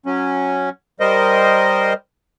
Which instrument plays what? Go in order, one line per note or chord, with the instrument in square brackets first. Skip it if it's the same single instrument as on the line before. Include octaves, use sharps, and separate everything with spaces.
[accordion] F#3 C#4
G3 A#4 C5 D#5